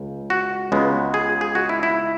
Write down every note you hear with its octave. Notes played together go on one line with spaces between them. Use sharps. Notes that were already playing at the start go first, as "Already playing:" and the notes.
Already playing: C#2
F#4
C#2 C#3 G#3 B3
G#4
G#4
F#4
E4
E4